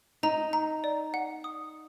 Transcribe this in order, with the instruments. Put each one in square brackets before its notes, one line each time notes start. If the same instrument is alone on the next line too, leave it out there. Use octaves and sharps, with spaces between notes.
[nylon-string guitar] D#4 [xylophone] A#5
[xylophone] A#5
D5
F#5
D#6